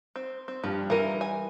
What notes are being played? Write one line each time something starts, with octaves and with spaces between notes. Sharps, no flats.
C4
C4
G2 F3
E3 G3 F4 A#4 B4 D#7
G#5